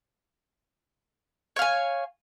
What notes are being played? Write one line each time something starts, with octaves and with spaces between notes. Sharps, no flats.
C#5 F5 G#5